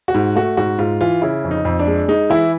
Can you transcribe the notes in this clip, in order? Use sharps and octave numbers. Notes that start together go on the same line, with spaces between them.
F#4
G#2
A3 F#4
G#2 F#4
G#2 F4
E3 F4
C#3 E4
F2
D#4
F2
D4
G#3
G#3 D#4
E3 E4